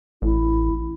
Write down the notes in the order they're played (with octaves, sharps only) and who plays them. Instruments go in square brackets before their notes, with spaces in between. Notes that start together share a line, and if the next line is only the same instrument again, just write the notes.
[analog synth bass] A1 [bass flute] E4